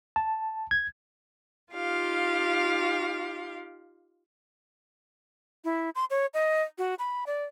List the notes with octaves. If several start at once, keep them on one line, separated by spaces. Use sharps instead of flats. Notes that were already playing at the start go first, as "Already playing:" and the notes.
A5
G#6
D#4 F4 G4 F5
E4
C6
C#5
D#5
F#4
B5
D5